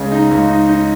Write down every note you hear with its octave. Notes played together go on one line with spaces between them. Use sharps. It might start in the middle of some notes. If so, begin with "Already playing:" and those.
Already playing: C#2 C#3
D#4
C#2
D#4
D#4